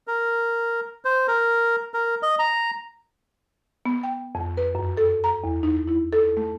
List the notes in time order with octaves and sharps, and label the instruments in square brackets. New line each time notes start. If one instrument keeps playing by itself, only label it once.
[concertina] A#4
C5
A#4
A#4
D#5
A#5
[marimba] B3
G5
F2
B4
F#2
A4
A#5
E2
D#4
E4
A4
A3